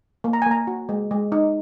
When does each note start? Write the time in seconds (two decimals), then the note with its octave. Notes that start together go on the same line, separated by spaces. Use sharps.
0.24 A#3
0.33 A#5
0.42 G#5
0.46 A#3 A#5
0.67 F#4
0.89 G#3
1.11 G#3
1.32 D#4